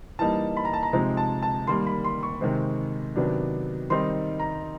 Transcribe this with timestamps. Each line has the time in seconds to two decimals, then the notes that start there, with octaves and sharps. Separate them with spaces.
0.19 E3 G3 A#3 D#4 A5
0.57 B5
0.65 A#5
0.73 A5
0.83 A#5
0.93 C3 F3 G#3 C4 D#4 A#5
1.17 A5
1.43 A5
1.67 D#3 G3 A#3 C6
1.87 B5
2.04 C6
2.23 C#6
2.41 C3 D#3 G#3 C4
3.16 C3 D#3 F#3 B3 D4
3.90 D#3 G3 C4 D#4 C6
4.40 A#5